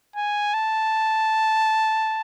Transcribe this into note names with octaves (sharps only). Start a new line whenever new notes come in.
G#5
A5